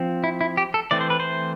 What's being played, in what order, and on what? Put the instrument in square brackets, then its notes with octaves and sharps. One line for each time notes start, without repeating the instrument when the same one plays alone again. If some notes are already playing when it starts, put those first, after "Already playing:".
Already playing: [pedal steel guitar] F3 C4
E4
E4
G4
A4
E3 A3 C4 D5
C5
B4
C5